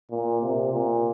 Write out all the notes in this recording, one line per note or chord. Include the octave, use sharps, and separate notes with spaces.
A#2
C3
A#2